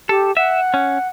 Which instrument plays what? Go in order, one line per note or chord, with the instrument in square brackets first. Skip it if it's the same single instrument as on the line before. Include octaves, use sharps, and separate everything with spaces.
[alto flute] G4 [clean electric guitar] A4
[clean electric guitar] E5 [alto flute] F#5
[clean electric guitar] C#4